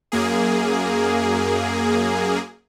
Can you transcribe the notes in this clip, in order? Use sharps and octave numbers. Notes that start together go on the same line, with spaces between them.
F#2 A#3 G#4